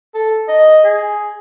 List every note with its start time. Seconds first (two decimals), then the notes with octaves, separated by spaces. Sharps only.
0.15 A4
0.49 D#5
0.85 G#4